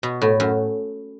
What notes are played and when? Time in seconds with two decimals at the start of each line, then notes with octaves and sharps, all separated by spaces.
0.03 B2
0.22 A2
0.40 F#2